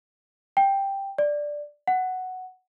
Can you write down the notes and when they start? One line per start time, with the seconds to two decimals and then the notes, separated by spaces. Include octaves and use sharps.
0.57 G5
1.18 D5
1.87 F#5